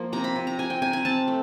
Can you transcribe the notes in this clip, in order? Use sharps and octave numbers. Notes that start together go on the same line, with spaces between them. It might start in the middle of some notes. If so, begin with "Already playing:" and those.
Already playing: F3 A#3
C3 A#5
B5
C3
A#5
C3 G#5
G5
C3 G#5
G#5
C4 A5
A3